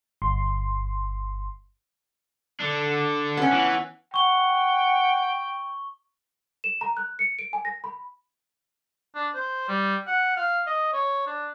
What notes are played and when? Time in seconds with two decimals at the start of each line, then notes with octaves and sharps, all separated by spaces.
0.22 G1 C6
2.60 D3 D4
3.37 B3 C#4
3.52 E3
4.14 F#5 G5 C#6 G7
6.64 E7
6.81 A#5
6.97 F#6
7.19 C#7
7.39 D7
7.53 G#5
7.65 A#6
7.84 B5
9.15 D4
9.35 C5
9.68 G3
10.07 F#5
10.37 F5
10.67 D#5
10.93 C#5
11.27 D4